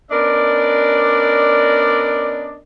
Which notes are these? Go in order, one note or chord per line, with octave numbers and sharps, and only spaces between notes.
B3 C#4 D4 A#4 D5 D#5